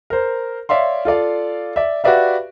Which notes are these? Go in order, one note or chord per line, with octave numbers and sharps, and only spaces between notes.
A#4 C5
C#5 D5 E5 F5 C6
F4 A4 D5 F5
D5 E5
F#4 G4 B4 D5 E5 F5